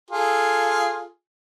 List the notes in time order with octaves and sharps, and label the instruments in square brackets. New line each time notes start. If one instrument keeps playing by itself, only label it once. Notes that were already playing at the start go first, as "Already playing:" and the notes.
[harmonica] F4 G#4 A4